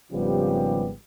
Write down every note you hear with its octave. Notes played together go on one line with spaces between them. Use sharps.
G#1 C#3 F3 G3 B3 G4